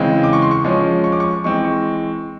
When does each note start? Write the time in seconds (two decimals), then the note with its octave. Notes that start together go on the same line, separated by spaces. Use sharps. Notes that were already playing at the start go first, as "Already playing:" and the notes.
Already playing: C#3 E3 G#3 C4
0.23 D6
0.33 C#6
0.42 C6
0.51 C#6
0.64 F3 G#3 C#4 C#6
1.04 C#6
1.12 D6
1.20 C#6
1.44 E3 G#3 C4 C#6
1.64 C#6